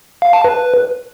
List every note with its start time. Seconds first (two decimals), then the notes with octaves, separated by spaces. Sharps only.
0.22 F5
0.33 A5
0.44 B4